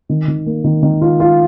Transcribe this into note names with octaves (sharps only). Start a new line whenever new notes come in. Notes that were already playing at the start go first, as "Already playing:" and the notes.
D#3
D#3
A#3
D#3
D#3
F4
F4